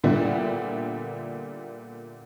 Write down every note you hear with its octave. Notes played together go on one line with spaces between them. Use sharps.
A#2 D3 G3 B3 E4